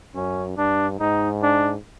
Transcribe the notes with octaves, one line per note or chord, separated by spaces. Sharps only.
F#2 C#4
G2 D4
G#2 D#4
D4